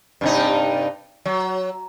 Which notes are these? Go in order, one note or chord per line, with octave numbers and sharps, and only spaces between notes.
G2 C3 D#4
F#3